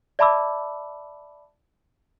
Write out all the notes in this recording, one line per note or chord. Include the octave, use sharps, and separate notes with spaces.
D5 E5 A5 B5 D6 E6